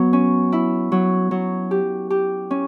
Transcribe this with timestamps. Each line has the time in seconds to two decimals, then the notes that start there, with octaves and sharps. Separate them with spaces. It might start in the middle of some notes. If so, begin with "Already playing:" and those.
Already playing: F#3 B3
0.13 C#4
0.52 E4
0.92 F#3
1.31 F#3
1.71 G4
2.10 G4
2.51 C#4